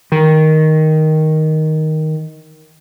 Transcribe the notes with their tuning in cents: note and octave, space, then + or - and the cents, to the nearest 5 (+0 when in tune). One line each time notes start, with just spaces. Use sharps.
D#3 +5